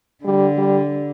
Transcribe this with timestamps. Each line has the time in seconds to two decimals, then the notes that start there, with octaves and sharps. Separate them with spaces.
0.24 D3 G3
0.58 G3